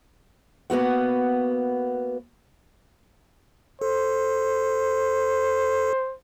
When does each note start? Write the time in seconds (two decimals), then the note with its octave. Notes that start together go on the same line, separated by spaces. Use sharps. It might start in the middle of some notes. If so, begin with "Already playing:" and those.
0.70 A#3 B3 F#4 F#5
3.81 A4 C5